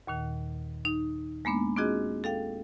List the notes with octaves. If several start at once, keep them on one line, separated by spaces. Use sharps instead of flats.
D#2 A#2 D#3
D#4
G#3 A#3 B3 D4
C4 D4 F4 F#4 G#4 D#5
A4 F5 G5